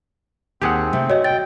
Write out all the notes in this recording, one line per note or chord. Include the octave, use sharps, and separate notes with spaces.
D#2 C4 G4 G#4 F#5 A5
C3 A3
F#4 C#5 D#5
G5 A6